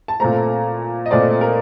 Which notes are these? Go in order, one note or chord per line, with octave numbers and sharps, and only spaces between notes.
A5
A#2 A3 C4 A#5
D#5
A#2 A3 C4 D5
A#4